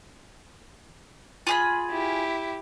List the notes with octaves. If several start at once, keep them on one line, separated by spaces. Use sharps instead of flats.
F4 G#4 B5
E4 G4